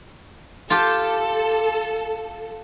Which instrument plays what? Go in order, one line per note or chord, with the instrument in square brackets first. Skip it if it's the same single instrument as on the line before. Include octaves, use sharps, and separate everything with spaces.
[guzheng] F4 G4 [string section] A4